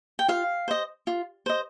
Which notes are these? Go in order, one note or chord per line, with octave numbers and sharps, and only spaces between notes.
G5
F4 F5
C5 D#5
F4
C5 D#5